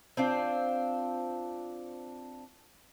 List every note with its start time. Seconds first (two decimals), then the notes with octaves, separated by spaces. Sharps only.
0.17 C4 D4 F4